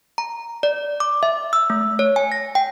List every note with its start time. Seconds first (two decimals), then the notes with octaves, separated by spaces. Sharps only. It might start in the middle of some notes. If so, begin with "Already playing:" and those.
0.18 A#5
0.63 D5
1.00 D6
1.23 E5
1.53 E6
1.70 A3
1.99 C#5
2.16 G#5
2.32 A#6
2.55 G5